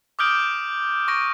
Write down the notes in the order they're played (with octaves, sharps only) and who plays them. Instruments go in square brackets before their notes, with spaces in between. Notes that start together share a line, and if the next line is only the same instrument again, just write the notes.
[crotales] D6 D#6 F6 G6 D7 F#7
C#6 A#6 D7